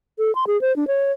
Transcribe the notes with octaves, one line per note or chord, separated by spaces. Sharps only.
A4
C6
G#4
C5
D4
C#5